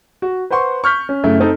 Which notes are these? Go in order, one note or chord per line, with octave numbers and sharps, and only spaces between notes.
F#4
B4 C5 F#5 C6 C#6
C#6 F6 G6 B6
C#4
F#2 C#3 A3 E4
C4 D#4 A4